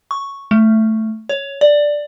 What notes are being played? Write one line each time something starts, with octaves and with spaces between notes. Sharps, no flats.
C#6
A3
C#5
D5